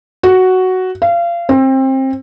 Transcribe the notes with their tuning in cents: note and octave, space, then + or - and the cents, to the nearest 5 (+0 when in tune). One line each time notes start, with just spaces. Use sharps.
F#4 +5
F5 -30
C4 +25